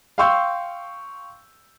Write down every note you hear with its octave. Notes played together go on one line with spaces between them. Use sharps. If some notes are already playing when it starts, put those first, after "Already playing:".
F5 G5 C6 C#6 E6 G6